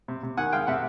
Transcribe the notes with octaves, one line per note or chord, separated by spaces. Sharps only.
C3
C3
D#3 F#5 G#5
G#3 F5 G5
C3 E5 F#5